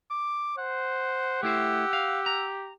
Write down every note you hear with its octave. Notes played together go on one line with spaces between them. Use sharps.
D6
C5 F#5
A3 E4 G4 C5 E6
F5
A#5